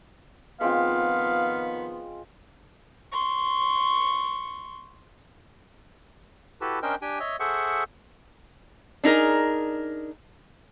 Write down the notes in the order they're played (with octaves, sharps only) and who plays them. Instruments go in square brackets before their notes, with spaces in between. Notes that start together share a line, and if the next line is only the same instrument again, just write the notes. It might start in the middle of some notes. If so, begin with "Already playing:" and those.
[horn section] D#3 F3 B3 [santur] G#3 C4 F4 [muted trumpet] F5
[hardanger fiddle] C6 C#6
[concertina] E4 F#4 G4 A4 B4 A5
C#4 D4 A#4 C5 D#5 G5
D4 G4 G5 G#5
C#5 D#5 E5
G#4 A4 C5 E5 F#5 C#6
[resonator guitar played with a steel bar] D4 D#4 G#4 A#4